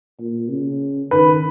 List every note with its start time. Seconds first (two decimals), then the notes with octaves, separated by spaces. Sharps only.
0.20 A#2
0.50 C#3
1.11 D#3 B4